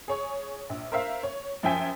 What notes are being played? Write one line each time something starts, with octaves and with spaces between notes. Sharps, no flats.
G#4 C#5 C#6
A#1
A#4 C5 E5 F5
C#5
F#2 F3 E5 G5 G#5 B6